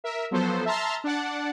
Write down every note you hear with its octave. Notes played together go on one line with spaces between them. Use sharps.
A#4 E5
F3 F#3 B3 A4 C5
E5 A5 A#5 C6 F6
D4 D5 F#5